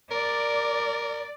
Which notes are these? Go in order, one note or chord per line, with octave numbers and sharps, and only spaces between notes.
A#4 D5